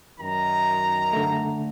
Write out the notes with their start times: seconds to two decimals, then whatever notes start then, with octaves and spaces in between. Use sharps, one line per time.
0.20 F#2 D#3 A#5
1.13 D3 A3